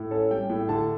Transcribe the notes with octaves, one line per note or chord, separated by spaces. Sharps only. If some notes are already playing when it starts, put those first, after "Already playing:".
Already playing: A2
C#4 A4
G3 G5
A2
D3 A5